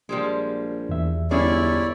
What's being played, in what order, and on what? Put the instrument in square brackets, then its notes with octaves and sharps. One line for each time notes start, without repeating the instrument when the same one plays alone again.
[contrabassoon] A#1 [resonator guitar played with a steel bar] F3 G3 G#3
[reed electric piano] E2 E5
[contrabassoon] G1 [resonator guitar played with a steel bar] G#3 C#4 [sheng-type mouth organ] E4 C#5 D5